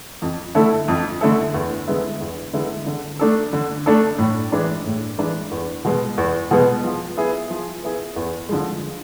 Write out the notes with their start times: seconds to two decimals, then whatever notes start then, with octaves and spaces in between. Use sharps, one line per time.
0.22 F2
0.55 D3 A3 E4 A4
0.88 F2
1.21 D3 A3 E4 A4
1.54 E2
1.87 D3 G#3 B3 E4
2.21 E2
2.53 D3 G#3 B3 E4
2.86 D3
3.19 A3 D4 A4
3.53 D3
3.86 A3 D4 A4
4.18 A2
4.52 E3 G#3 D4
4.85 A2
5.18 E3 G#3 D4
5.51 E2
5.85 B2 G#3 B3
6.18 E2
6.51 B2 G#3 B3
6.83 F3
7.17 B3 E4 G#4
7.50 F3
7.83 B3 E4 G#4
8.16 E2
8.49 D3 F3 G#3